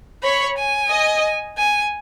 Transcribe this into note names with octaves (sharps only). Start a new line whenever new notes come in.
C#5 B5
G#5
D#5
G#5